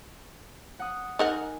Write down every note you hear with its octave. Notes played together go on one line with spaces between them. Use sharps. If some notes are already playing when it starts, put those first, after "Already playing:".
F#5 D#6
D#4 A#4 F#5 G#5